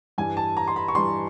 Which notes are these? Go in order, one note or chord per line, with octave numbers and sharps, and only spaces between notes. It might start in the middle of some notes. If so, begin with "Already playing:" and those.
G2 E3 G3 G#5
A5
A#5
C6
B5
C#6
G2 E3 G3 C6